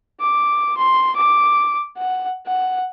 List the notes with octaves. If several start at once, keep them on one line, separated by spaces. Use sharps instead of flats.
D6
C6
D6
F#5
F#5